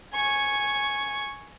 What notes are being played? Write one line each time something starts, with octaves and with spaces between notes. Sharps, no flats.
G#5 C#6